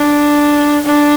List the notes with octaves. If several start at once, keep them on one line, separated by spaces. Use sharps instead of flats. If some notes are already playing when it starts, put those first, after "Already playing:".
Already playing: D4
D4